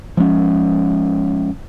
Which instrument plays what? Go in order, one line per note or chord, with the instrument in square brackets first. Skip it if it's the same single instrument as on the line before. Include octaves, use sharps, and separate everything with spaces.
[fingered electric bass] F3 G#3 C#4